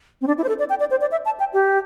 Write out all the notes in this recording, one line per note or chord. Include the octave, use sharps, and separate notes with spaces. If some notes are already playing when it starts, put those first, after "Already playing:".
C4
D4
E4
C5
A4
D5
G5
D5
C5
D5
E5
A5
G5
G4